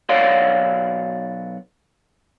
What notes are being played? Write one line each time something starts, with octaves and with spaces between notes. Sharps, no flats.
B1 C#5 D5 F5 F#5 C6